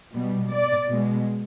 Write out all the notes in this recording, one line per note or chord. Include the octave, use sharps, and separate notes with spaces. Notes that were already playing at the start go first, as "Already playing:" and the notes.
B2 G3
D5
B2 G#3